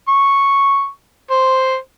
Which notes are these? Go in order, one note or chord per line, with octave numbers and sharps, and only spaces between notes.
C#6
C5